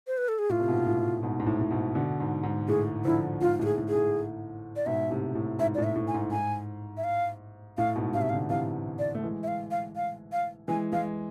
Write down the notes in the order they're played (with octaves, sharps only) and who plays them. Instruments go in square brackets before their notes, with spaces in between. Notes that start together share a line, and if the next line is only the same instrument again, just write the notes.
[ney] C5
B4
A4
G#4
[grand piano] A2 [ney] F4
[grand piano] C3
G#2 B2
A2
G#2 B2
G#2
A2
A2
G#2 B2
B2 D3
G#2
G#2
[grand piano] A2 [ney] G#4
[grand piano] D3 F3 [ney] E4
[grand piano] G#2 [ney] F4
[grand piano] A2 [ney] F4
[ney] G#4
[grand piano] A2
[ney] G#4
[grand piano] A2
[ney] D5
[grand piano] G#2 B2 [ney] E5
[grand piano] A2 C3
A2
[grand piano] G#2 [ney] E5
[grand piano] A2 [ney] D5
[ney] E5
[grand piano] A2
[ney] G#5
[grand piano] G#2
[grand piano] G#2 [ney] G#5
[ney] E5
F5
[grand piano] A2 [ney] F5
[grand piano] G#2 B2
[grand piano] A2 C3 [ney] F5
[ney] E5
F5
[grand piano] B2 D3
[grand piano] C3 E3 [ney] F5
[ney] D5
[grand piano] A3
E3 G#3
[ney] E5
F5
F5
F5
F5
[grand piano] E3 G#3 [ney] G#5
[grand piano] E3 G#3 [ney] F5